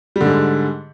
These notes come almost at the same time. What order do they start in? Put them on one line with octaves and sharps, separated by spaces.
G3 D3 G#2